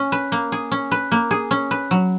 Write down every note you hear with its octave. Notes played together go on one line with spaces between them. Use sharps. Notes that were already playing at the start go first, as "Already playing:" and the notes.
Already playing: C#4
B4
A#3
G#4
C#4
B4
A#3
G#4
C#4
B4
F#3